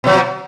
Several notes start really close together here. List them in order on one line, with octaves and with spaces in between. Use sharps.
B2 F#3 F3